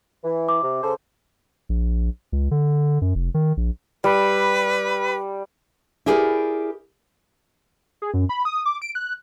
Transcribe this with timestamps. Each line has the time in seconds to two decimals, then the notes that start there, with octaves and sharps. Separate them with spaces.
0.24 E3
0.49 D6
0.63 C3
0.83 C#3 A4 C5
1.69 A#1
2.32 C#2
2.51 D3
3.02 F#2
3.15 F1
3.34 D#3
3.57 A#1
4.04 G3 B4
6.06 E4 G4 G#4 A#4 C5 D5
8.02 G#4
8.14 F#2
8.29 B5
8.45 D#6
8.66 D6
8.82 D7
8.95 F#6